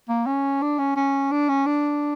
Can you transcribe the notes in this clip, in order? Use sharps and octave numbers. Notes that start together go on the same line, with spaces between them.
A#3
C#4
D4
C#4
C#4
D4
C#4
D4